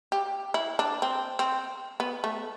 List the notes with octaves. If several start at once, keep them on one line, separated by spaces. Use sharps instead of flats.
G4
E4
D4
C4
C4
B3
A3